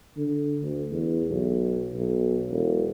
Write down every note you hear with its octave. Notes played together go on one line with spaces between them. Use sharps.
D3
D2
E2
B1
B1
E1